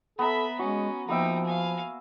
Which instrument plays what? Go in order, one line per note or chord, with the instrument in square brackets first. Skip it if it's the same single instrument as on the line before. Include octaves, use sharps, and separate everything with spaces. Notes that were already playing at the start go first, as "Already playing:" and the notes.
[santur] B3 A#5 [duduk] A4 [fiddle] E5 B5
[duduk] G#3 [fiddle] C#4 [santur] F#4
[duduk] F3 [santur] A#3 B3 E5 [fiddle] D#4 G5
[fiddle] F5 G#5